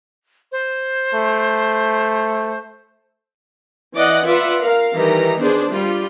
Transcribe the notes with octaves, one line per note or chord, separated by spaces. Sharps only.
C5
A3
E3 D5 D#5 F#5
F4 B4 D5 E5 F#5
A#4 F5
D#3 E3 G3 A#5
B3 D4 G#4 C5
G3 F4